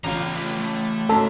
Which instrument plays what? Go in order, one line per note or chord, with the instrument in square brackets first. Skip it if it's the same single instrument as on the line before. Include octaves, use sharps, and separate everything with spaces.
[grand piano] A1 C#3 F4 [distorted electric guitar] D4 A#5
[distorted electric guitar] A3 B4
A3
[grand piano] G#2 C#3 F#3 [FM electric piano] A4